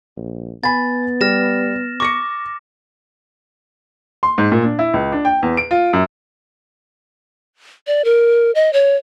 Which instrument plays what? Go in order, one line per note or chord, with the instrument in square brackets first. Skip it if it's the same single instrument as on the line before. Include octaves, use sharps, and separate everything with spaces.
[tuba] A#1
[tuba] B3 [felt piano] G#5 B5 [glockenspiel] A6
[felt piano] G3 [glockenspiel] F6 A#6 E7
[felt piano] C#6 A#6 C#7 [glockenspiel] D6
[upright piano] C6
G#2
A#2
D4
E4
C#2
D4
G5
E2
D7
F4
F#2
[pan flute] D5
A#4
D#5
C#5